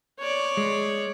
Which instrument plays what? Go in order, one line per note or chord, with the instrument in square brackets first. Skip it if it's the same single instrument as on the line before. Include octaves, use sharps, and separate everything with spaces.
[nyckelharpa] C#5 D5
[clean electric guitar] G#3